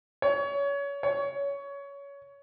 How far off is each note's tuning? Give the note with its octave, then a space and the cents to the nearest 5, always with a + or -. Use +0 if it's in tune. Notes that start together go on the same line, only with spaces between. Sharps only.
C#5 +25
C#5 +20